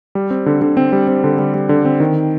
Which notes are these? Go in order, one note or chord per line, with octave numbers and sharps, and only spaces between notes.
G3
C4
D3
D3
C4
G3
C4
D3
G3
G3
D3
C4
D#3